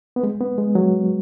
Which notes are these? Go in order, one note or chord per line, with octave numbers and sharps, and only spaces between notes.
B3
G#3
B3
G#3
F#3